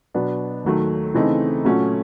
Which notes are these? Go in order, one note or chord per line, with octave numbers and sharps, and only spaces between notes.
B2 F#3 B3 D4
D#2 D#3 F#3 A3
C#3 E3 A3 C4 D#4
A#2 F#3 A3 C#4 F#4